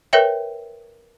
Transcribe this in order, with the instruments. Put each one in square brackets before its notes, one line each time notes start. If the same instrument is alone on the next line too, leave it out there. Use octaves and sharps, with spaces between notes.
[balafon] A#4 B4 C#5 E5 G5